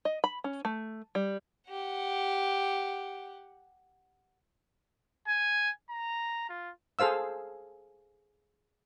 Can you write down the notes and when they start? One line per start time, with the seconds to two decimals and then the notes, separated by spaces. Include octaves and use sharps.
0.05 D#5
0.24 B5
0.44 C#4
0.65 A3
1.15 G3
1.69 G4 F#5
5.28 G#5
5.90 A#5
6.49 F4
6.99 G#4 A4 C5 F5 E6